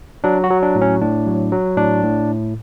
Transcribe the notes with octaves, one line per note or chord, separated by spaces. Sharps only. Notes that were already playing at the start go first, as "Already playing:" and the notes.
F#3 D4
F#4
F#3
D4
A2
C#4
A2 D4
F#3
F#3
A2 D4
A2